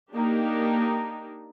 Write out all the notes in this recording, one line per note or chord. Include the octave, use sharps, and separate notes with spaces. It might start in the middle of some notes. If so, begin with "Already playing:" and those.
A#3 D4 D#4 G4